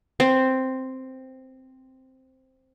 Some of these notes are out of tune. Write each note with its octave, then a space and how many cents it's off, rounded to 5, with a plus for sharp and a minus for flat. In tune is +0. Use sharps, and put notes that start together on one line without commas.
C4 +0